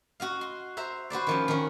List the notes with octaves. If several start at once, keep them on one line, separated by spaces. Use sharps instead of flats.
F#4 D#5 F5
C6
C5 E5 A#5
F#4 B4 C5 D5
D#3 F3 C#4
D#3 C#4